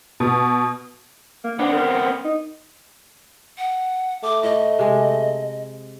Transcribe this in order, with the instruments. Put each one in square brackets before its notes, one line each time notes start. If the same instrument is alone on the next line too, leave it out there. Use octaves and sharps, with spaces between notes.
[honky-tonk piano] B2
[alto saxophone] A#3
[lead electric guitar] B3 C4 [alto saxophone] D4
[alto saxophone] A#4
D#4
[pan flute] F#5
[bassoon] A3 [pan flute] D6
[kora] A2 [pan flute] D#5
[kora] C3 G#3